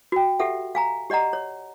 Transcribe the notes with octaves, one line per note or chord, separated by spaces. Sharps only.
F#4 G5
G4 A4 E5 F#5
F5 G#5 A#5
G4 D5 D#5 F#5 A#5
C#5